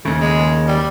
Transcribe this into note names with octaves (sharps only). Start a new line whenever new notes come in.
D#2 C#3 A3
G#3
G3